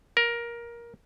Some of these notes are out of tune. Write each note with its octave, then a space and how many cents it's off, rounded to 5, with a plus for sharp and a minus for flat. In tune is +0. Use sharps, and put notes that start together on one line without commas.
A#4 +15